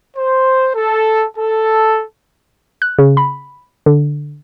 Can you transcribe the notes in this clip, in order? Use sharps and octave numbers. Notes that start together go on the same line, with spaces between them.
C5
A4
A4
F#6
C#3
B5
D3